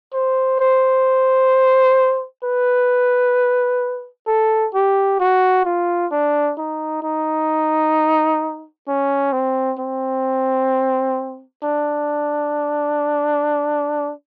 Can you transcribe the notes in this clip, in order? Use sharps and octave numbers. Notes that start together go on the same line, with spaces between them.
C5
C5
B4
A4
G4
F#4
F4
D4
D#4
D#4
C#4
C4
C4
D4